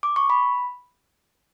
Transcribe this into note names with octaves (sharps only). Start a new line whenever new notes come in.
D6
C#6
B5